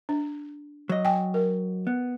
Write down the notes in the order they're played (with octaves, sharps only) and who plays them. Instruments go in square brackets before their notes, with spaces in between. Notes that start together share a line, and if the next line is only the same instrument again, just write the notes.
[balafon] D4
[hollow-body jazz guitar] F#3 D#5
[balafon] G5 G#5
A#4
[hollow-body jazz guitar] B3